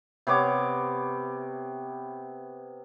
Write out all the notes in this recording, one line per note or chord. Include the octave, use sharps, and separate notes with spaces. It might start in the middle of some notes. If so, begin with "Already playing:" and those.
C3 B3 C#5 D6